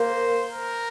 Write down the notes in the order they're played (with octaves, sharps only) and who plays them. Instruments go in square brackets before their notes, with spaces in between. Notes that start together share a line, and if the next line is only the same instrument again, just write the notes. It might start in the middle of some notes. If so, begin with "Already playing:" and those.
Already playing: [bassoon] A#3 [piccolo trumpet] C5
[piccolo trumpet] A#4